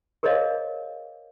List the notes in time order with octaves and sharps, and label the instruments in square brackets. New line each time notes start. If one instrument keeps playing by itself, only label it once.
[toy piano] G#4 A#4 C5 C#5 D#5 F5